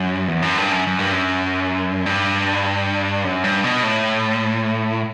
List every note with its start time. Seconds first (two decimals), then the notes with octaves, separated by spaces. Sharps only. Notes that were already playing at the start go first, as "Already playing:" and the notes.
Already playing: F#2
0.28 E2
0.42 F#2
0.58 G2
0.72 F#2
0.87 F#2
0.99 G2
1.12 F#2
2.06 G2
3.25 F#2
3.44 G2
3.64 B2
3.83 A2